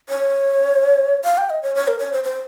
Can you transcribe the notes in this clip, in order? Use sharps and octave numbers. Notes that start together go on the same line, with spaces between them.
C#5
F5
G5
D#5
C#5
C#5
A#4
C#5
C5
C5